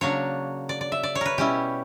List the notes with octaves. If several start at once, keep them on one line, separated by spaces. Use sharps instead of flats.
C#3 F#3 A#3 D4 C#5
D5
D5
E5
D5
C#5
A#4 B4
B2 G3 C#4 E4 G4